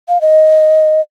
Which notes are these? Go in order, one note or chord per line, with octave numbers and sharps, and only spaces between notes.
F5
D#5